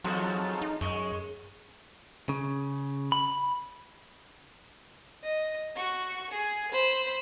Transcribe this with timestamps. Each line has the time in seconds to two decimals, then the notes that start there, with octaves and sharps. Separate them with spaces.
0.04 E2 G#2 F#3 C4 F4 F#4 A4
0.61 D#4
0.81 F#2 G#3 C#6
2.29 C#3
3.12 B5
5.23 D#5
5.75 F#4 C#6
6.30 G#4
6.71 C5 B5